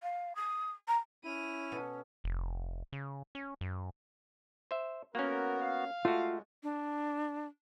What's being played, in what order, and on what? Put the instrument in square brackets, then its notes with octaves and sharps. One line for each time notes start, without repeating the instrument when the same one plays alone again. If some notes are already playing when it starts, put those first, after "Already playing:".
[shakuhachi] F5
D#6
A#5
[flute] C#4 [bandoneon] E4 [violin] D#7 F7
[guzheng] B2 B3 A4
[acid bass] F1
C#3
C#4
F#2
[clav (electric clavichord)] C5 E5
[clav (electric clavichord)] A#3 C#4 [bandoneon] B3 F#4 [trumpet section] A#4
[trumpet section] F5
[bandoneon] G#3 [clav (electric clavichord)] A3 F#4 [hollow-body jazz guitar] F4
[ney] D4